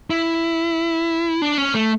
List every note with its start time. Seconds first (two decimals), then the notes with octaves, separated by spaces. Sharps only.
0.10 E4
1.42 D4
1.58 C#4
1.75 A3